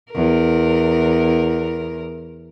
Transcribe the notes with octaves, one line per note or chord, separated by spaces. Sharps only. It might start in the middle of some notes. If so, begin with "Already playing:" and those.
E2 A#4